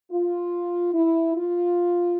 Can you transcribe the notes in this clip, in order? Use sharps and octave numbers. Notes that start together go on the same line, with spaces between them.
F4
E4
F4